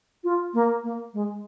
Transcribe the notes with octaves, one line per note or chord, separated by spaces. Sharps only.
F4
A#3
A#3
G#3